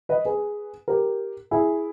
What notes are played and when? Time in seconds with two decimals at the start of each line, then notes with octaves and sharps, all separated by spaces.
0.09 B4 D#5
0.25 G#4 B4
0.88 G4 A#4
1.51 E4 G#4